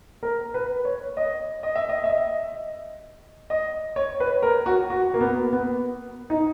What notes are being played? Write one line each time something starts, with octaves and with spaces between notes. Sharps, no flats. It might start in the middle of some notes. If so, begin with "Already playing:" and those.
A#4
B4
C#5
D#5
D#5
E5
D#5
E5
D#5
D#5
C#5
B4
A#4
F#4
F#4
A#3
B3
B3
D#4